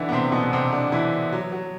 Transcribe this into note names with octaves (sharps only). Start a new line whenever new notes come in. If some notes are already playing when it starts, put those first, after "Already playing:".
Already playing: D3 E3 D4 E4
B3
C3 C4
B2 B3
C3 C4
D3 D4
E3 E4
F#3
F#3